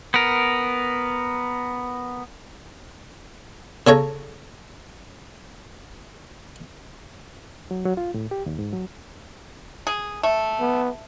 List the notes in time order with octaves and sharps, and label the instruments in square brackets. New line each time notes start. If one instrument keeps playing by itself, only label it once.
[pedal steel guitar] B3 A#4
[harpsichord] C#3 A4 C#5 A#5
[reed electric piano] F#3
F#3
F4
A2
G4
D#2
G#2
F#3
[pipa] G#4
A3
[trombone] B3